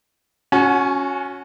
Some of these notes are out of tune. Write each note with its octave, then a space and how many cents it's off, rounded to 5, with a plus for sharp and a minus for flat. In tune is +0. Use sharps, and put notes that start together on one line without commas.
C#4 +0 F#4 -20 G#5 +45